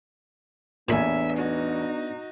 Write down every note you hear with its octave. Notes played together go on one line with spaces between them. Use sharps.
A1 E2 A#2 B3 D4 E5 G#5 B5
D#4 F#4